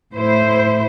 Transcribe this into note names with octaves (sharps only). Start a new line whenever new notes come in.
A2 E4 C5